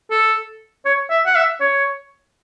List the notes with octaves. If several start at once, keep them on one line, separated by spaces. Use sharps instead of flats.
A4
C#5
E5
F#5
E5
C#5